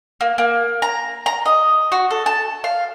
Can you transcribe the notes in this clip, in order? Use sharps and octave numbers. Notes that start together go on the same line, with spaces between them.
A#3
A#3
A#5
A#5
D#5
F#4
A4
A5
F5